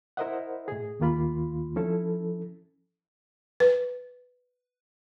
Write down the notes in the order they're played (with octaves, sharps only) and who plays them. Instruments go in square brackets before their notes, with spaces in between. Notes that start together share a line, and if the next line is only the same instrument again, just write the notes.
[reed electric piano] E4 A#4 C5 D#5 E5 F#5
A2 G#4
D#2 D#3 A#3 F4 B5
F3 C#4 E4 A4
[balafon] B4